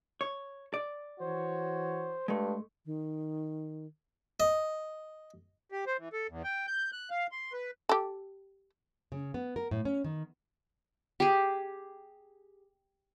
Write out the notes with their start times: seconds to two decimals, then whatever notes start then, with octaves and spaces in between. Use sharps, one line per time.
0.21 C#5
0.74 D5
1.20 E3 F#4 C5 C#5
2.28 G2 G#3 A3
2.86 D#3
4.40 D#5
5.72 G4
5.87 C5
5.98 E3
6.13 A4
6.30 E2
6.44 G5
6.67 G6
6.92 F#6
7.10 F5
7.32 C6
7.53 B4
7.89 G4 A4
9.12 C#3
9.34 B3
9.56 A#4
9.71 A2
9.85 C#4
10.04 D#3
11.20 G4 G#4